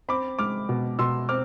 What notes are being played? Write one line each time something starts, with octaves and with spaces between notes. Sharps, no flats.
C4 B5 D6
G#3 D6 F6
B2
B2 C6 E6
C4 D6 F6